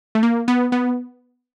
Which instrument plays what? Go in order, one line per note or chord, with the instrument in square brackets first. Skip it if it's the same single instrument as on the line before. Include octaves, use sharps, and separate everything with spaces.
[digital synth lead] A3
A#3
B3
B3